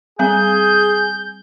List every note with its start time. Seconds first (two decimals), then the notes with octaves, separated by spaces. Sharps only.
0.19 G3 C4 G#4 G#5 G6